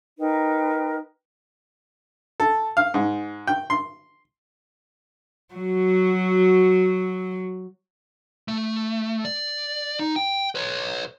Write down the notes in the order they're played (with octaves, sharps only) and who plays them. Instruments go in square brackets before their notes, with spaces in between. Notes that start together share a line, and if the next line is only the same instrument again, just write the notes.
[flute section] D#4 A#4 B4 G5
[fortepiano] A4
F5
G#2
G5
C6
[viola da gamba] F#3 F#4
[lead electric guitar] A3
D5
D#4
G5
B4 C#5